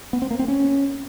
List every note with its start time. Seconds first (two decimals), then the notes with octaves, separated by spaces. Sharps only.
0.13 B3
0.22 C4
0.31 A#3
0.39 C4
0.48 C#4